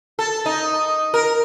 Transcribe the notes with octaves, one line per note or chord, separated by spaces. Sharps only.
A4
D#4
A#4